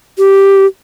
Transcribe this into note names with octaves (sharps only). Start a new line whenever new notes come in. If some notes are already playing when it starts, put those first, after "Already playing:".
G4